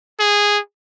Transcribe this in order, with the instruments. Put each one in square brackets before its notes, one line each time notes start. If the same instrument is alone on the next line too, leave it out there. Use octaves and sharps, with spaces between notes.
[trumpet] G#4